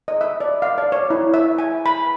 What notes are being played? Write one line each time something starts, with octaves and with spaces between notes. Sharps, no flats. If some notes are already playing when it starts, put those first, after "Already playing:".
D#5
E5
D5
F5
D5
C#5
E4
E5
G#5
B5